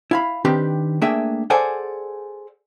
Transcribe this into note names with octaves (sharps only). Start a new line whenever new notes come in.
E4 F5 B5
D#3 C4 D4 G4 B4
A3 A#3 D4 G#4 E5 G5
G#4 A4 C5 D5 F#5 G#5